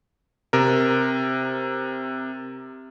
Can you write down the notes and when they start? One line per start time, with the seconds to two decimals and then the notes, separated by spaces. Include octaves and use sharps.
0.53 C3 A#4